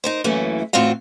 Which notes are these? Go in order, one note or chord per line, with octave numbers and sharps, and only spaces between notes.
D#4 A#4 C5
F#2 E3 A3 A#3 C#4
E2 A2 C4 F4 F#4 F5